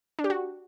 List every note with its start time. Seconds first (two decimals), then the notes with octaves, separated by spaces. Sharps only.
0.19 D4
0.24 G4
0.30 F#4